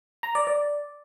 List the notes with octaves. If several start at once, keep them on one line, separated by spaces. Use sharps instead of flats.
A#5
D5
D5